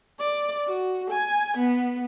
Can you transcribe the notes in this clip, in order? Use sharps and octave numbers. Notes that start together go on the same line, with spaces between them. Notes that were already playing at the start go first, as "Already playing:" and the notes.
D5
F#4
G#5
B3